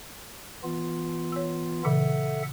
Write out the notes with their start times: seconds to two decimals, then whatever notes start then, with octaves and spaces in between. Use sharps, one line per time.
0.64 E3 B3 F4
1.32 C#5 E6
1.85 A#2 C#3 E3 A4 E5 F#5